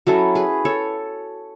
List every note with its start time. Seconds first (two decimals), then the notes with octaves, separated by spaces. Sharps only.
0.07 F#3 C#4 E4 F#4 A4
0.35 G#4 B4
0.65 A4 C#5